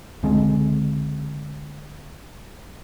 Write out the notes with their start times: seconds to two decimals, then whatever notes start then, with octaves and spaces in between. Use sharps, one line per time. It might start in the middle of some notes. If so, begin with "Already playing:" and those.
0.23 C#2 D3 G#3 C4